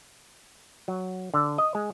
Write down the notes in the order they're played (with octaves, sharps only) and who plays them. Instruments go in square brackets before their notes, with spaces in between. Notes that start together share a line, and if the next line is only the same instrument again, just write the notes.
[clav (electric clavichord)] F#3
D3
D#5
G#3